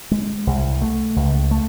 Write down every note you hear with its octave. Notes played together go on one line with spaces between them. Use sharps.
G#3
C2
A3
C#2
A3